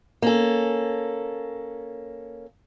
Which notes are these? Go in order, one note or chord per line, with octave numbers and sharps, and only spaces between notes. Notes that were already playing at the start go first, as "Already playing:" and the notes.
A#3 C#4 A4